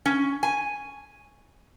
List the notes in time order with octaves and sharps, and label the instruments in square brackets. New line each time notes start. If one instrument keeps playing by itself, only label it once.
[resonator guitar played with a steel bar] C#4
G#5